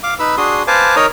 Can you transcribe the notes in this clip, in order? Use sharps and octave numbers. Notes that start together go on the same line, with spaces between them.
F5 D6
D#4 B4 B5 E6
D4 F#4 G#4 C6 D#6
B4 C5 F5 G#5 A5 D6
D#4 A#4 C#5 A#5 D#6